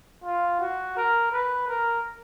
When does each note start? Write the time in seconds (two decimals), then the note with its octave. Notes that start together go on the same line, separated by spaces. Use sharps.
0.24 F4
0.60 F#4
0.96 A#4
1.32 B4
1.68 A#4